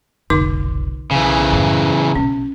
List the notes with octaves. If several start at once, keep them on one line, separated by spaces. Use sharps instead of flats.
F1 B1 D3 D#4 D6
B1 C#3 E3
F#2 A2
A#1 B2 C#4